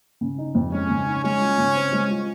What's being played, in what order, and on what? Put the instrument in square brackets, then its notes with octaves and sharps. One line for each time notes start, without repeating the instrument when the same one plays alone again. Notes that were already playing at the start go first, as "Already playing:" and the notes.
[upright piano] C#3
D#4
F2
[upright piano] G#3 [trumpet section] C#4
[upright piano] C#3
D#4
[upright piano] G#3 [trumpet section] C#4
[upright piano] F4
C#3
C4
G#3
F4